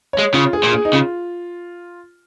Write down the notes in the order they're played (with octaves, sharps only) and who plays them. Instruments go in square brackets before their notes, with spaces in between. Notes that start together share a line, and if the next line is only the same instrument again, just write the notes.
[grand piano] C#5
[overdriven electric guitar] G#3
[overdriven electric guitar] C#3 [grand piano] F4
[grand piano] G#4
[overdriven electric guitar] A#2
[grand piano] G#4
D#4
[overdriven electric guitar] C#3 [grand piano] F4